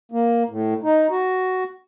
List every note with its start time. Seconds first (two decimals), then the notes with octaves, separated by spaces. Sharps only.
0.12 A#3
0.49 A2
0.83 D#4
1.10 F#4